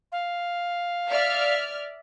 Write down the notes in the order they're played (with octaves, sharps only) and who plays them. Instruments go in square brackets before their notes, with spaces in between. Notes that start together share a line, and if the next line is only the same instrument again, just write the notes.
[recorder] F5
[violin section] D5 E5 F6